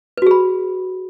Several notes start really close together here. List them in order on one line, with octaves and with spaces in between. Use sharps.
B4 F#4 G#4 B5